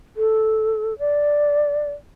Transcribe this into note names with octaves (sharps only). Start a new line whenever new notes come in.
A4
D5